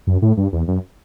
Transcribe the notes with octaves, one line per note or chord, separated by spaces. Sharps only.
F#2
A2
G2
E2
F#2